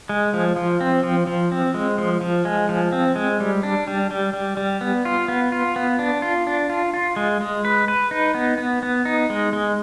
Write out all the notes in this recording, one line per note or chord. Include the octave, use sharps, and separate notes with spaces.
G#3
F3
F3
C4
F3
F3
C4
G#3
F3
F3
G#3
F3
C4
G#3
G3
D4
G3
G3
G3
G3
B3
F4
B3
F4
B3
D4
F4
D4
F4
F4
G#3
G#3
B4
B4
D#4
B3
B3
B3
D#4
G#3
G#3